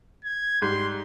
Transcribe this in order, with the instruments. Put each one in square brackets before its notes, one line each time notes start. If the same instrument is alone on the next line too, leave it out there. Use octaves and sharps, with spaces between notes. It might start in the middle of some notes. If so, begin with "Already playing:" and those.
[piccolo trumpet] G#6
[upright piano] G#2 G3 G6 [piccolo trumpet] C6